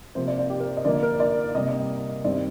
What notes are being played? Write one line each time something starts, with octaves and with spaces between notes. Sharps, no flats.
C3 F3 A#3 C5
D5
D5
G4
A#4
D#5
D3 F3 A#3 D5
A#4
D5
C3 G3 A#3 D#5
D#5
G2 D#3 G3 C4 D5